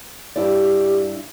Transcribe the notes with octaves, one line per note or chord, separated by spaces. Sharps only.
G2 E4 G4 D5